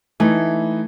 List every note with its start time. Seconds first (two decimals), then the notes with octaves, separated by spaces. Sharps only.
0.20 E3 A3 D#4 E4